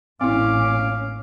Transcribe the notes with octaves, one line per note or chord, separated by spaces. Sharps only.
A1 A#2 C4 C#4 E4 F5 D6